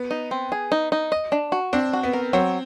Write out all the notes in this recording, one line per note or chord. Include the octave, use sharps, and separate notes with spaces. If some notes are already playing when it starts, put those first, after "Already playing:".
Already playing: B3
D#4
C4
G#4
D#4
D#4
D#5
D4
F#4
C4 D4
F#4
B3
A#4
F#3 C4